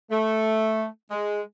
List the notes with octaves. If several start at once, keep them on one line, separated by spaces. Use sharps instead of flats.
A3
G#3